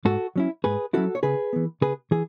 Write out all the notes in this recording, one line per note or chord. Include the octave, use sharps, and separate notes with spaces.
G#2 F#4 A4
F#3 C#4 E4
G#2 G#4 B4
F#3 C#4 E4 F#4 A4
C#5
C#3 G#4 B4
E3 B3
C#3 G#4 B4
E3 G#4